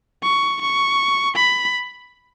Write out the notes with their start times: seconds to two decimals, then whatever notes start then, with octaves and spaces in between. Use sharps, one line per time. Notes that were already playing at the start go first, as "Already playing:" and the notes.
0.23 C#6
0.61 C#6
1.36 B5